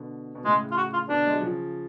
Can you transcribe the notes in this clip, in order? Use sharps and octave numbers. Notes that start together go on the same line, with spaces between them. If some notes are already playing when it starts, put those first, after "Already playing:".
Already playing: B2 D3
B2
A2 C#3 G#3
F4
F#4
F4
B2 D3 D4
G#3
F#3
C#3 F3